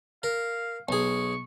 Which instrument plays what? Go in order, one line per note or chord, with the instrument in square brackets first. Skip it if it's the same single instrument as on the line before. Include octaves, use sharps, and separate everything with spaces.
[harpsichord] A#4 [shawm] F5
[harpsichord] B1 G#4 [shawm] C#6